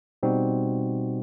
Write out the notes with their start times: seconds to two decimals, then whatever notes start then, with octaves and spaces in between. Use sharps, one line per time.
0.23 B2 G3 C4 D#4 F#4